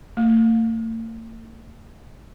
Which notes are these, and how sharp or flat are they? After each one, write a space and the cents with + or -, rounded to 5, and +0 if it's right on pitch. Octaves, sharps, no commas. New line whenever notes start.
A3 +45